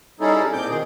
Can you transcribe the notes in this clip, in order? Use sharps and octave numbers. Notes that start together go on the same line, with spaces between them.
G3 C#4 D#4 E4 G#4 A4
A#2 C4 D6 G6
B2 D#3 G#4